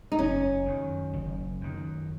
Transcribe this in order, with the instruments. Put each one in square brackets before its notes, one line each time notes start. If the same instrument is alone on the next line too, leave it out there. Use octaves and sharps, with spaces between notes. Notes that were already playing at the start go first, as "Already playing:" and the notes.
[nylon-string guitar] D#4
[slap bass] F#1 [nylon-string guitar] C#4
[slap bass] F#2 D#3
F#1
F#2 D#3